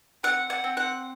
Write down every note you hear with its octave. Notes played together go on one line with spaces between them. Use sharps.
C4 F#5
F#5
C4
F#5